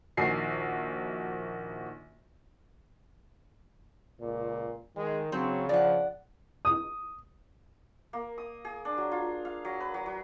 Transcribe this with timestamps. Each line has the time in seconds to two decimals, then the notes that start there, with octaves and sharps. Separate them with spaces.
0.17 A#1 D#3 F#4 G#5 C7
4.20 C#2 A#2
4.96 D#3 G#3
5.32 C#3 F#3 C4
5.69 F3 D5 F#5
6.65 D#6
8.13 A#3
8.38 D#6
8.65 G#4
8.85 D4
8.97 F#3
9.11 F4
9.45 F5
9.65 F#3
9.80 B4
9.94 F#3
10.06 F#3